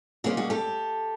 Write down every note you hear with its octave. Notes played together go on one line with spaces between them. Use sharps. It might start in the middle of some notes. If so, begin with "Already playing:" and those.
B2 G3 A#3 C#4 F4 F#4 G#4
F#4 G#4
G4 A4